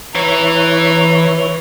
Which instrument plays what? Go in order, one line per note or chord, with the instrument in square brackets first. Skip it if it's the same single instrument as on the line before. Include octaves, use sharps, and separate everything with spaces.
[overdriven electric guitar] E3 [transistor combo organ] E4 B4 C#5 [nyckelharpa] A#5